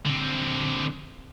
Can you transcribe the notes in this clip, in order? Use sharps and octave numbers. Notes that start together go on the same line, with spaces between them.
D3 C4